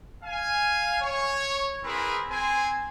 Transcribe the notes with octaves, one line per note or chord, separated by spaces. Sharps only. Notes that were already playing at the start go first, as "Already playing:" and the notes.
F5 G#5
C#5
C4 E4 G#4 A#4 B4
C4 C5 G#5